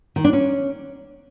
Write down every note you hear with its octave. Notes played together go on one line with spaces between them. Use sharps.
D#3
D4
C#4